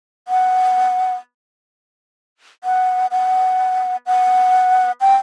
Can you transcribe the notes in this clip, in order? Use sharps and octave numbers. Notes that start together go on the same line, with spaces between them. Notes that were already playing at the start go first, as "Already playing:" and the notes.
F#5
F#5
F#5
F#5
G5